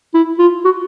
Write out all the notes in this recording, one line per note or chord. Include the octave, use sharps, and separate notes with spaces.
E4
F4
F#4